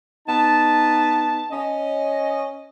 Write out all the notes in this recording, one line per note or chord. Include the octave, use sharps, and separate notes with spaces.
B3 D#4 A5
C#4 D#5